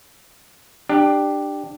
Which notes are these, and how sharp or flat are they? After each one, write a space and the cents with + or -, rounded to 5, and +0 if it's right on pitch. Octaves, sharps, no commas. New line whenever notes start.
D4 +15 G4 +0